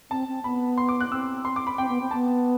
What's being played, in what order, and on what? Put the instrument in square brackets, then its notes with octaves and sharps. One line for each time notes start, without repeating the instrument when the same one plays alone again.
[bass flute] C4 [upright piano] A5
[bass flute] C4
[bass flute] B3 [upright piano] B5
[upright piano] C6
D6
F#6
[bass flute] C4 [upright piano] E6
[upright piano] C6
D6
B5
[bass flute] C4 [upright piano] G5
[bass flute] B3
C4
[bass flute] B3 [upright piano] A5